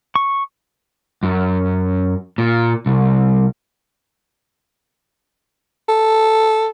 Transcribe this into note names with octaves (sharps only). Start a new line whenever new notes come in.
C#6
F#2
A#2
C2
A4